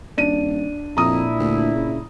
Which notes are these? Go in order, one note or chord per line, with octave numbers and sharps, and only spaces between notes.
D#1 D4 D#7
F2 A#2 D4 E4 A#5 D#6
D2
C#3